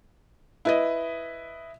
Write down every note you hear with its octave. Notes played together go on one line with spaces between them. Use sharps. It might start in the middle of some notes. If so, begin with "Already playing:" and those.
E4 B4 D#5